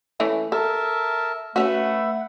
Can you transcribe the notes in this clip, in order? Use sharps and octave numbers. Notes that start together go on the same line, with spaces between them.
E3 A3 C#4
A4 A#4 E5 A5
A3 C#4 F#4 B4 E5 F#5